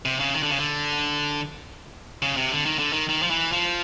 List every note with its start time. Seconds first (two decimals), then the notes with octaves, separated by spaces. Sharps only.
0.05 C3
0.20 C#3
0.34 D#3
0.43 D3
0.51 C#3
0.59 D3
2.22 C#3
2.37 C3
2.51 D3
2.66 D#3
2.79 D3
2.93 D#3
3.09 D#3
3.22 F3
3.30 E3
3.52 F3